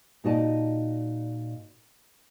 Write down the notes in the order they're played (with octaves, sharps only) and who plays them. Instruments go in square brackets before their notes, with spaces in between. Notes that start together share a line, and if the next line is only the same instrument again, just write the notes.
[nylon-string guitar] A#2 D#4 F#4 D5 D#5 A5